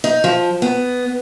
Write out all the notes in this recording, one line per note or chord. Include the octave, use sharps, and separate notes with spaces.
D#4
F3
B3